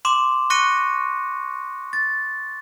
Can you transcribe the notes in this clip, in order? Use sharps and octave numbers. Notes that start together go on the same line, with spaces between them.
C6 D6 E7
C#6 F#6 A#6 C#7 D#7
A6